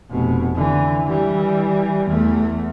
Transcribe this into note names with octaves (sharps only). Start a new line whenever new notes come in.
F1 B2
D3 E3
E3 G3
E2 A3